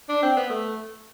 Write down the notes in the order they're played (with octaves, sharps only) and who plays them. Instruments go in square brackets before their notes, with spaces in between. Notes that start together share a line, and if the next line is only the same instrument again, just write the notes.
[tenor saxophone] D4
C4
B3
A3